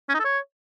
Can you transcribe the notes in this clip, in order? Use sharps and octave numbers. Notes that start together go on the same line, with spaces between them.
C#4
D#4
A4
C#5